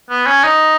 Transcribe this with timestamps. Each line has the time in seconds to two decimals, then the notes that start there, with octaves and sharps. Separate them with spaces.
0.10 B3
0.26 C#4
0.44 D#4